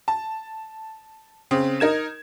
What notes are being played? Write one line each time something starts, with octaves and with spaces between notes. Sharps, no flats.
A5
C#3 C4
D#4 A#4 G#6 E7